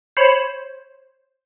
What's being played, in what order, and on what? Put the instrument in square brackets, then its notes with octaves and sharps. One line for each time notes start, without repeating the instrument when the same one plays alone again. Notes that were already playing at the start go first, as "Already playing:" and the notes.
[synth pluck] C5 C#5 B5